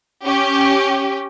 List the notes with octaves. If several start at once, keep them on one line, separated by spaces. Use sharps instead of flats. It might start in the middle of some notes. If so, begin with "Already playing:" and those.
C#4 G4